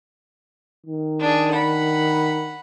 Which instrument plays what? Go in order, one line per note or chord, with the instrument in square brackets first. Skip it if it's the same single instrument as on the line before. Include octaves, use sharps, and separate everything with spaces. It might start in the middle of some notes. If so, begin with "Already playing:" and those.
[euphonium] D#3
[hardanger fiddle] D4 G#4
F#5 B5